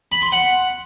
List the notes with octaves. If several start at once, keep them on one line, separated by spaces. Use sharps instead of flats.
B5
C6
F#5